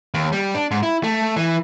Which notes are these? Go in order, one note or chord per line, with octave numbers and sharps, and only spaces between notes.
D#2
G3
D4
G#2
E4
A3
E3